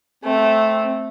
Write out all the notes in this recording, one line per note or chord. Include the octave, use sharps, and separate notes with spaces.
A3 C4